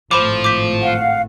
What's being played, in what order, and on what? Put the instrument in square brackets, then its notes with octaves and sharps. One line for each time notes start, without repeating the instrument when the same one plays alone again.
[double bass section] G#1 A2 A3 [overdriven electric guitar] F3 [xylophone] C5 B5 D6
[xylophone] D6 G6 B6
[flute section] F5 F#5